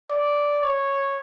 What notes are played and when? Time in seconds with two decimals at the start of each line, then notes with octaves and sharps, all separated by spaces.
0.10 D5
0.63 C#5